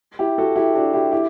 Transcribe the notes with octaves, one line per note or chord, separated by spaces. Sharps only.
E4 G4
F#4 A4
E4 G4
D4 F#4
E4 G4
E4 G4